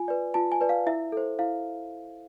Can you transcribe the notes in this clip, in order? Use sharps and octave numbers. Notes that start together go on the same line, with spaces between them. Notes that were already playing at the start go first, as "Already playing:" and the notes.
Already playing: F4 G#5
B4 D5
F4 A5
G#5
B4 D5
F5
E4 E5
A4 C5
E4 F5